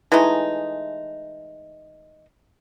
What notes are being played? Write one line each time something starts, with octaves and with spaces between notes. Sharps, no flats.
E3 G#3 A3 D#4